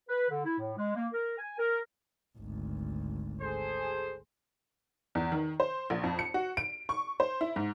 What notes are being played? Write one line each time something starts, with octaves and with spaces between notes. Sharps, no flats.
B4
D3
E4
A2
G#3
A#3
A#4
G#5
A#4
G#1 D2
G#4 A4 C5
E2
D#3
C5
A#1
F2
C#7
F#4
D7
C#6
C5
E4
G#2